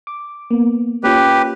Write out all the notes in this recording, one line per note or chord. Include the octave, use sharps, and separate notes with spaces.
D6
A#3 B3
A#3 C#4 F4 G4 B4